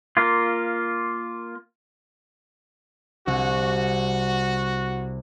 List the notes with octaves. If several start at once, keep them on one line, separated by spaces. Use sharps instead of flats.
A#3 F4
C2 F#4